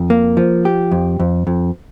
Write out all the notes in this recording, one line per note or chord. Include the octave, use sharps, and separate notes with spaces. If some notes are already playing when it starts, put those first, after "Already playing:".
Already playing: F2
A#3
F3
G4
F2
F2
F2